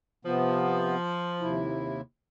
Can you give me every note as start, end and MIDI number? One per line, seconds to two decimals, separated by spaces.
0.25 0.96 48
0.25 1.67 53
0.25 0.96 59
1.41 2.01 39
1.41 2.01 48
1.41 2.01 64